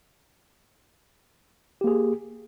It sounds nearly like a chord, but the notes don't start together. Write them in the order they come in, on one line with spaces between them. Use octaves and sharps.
G4 A#3 G#4